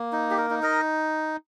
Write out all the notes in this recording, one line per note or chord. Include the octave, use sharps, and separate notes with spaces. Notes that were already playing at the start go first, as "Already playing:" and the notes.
Already playing: A#3
D#4
G4
A#4
D#4
A#4 D#5